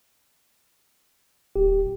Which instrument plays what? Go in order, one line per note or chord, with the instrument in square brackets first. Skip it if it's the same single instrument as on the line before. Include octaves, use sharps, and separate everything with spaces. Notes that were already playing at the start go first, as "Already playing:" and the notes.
[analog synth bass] D1 [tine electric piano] G4